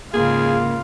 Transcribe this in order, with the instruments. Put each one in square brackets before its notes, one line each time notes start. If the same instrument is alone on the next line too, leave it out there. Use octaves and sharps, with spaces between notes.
[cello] G#2 C#3 [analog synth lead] A#3 [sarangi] F4 [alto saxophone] G#4